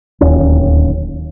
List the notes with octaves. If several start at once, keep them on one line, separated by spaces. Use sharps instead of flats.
D1 D#2 C#4